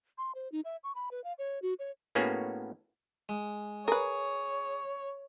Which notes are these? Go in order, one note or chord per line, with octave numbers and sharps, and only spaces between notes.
C6
C5
D#4
E5
C#6
B5
B4
F5
C#5
F#4
C#5
A2 A#3 B3 C#4 F#4 G#4
G#3
G#4 A#4 B4 C#5